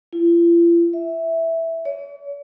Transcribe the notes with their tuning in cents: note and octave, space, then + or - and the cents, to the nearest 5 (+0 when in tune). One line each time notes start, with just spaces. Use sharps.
F4 -45
E5 -5
C#5 +45